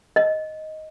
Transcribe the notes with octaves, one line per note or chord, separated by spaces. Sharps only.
D#5